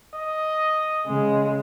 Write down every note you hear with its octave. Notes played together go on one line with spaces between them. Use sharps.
D#5
C#3 G#3